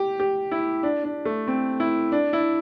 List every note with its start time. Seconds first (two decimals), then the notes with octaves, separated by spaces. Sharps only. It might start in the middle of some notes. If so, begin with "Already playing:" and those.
Already playing: G4
0.20 G4
0.51 E4
0.83 D4
1.04 D4
1.26 A3
1.48 C4
1.80 E4
2.12 D4
2.33 E4